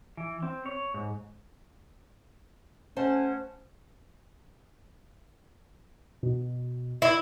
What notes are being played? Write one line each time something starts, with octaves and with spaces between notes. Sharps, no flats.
E3
C4
C#5
G#2
A3 C#4 C5 F#5 A5
B2
E4